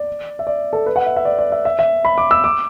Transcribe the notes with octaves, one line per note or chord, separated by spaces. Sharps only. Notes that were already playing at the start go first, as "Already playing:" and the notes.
Already playing: D5
E5
D5
A4
B4
F#5
E5
E5
D5
D5
E5
E5
E5
B5
D6
E6
D6